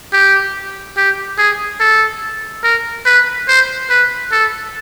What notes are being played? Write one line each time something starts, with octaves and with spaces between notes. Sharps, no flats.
G4
G4
G#4
A4
A#4
B4
C5
B4
A4